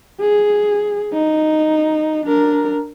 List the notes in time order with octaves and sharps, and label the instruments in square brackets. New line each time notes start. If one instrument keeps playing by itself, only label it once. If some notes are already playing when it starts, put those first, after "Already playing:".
[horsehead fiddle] G#4
D#4
D4 A#4